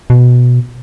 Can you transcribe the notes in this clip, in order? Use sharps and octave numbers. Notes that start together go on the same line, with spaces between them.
B2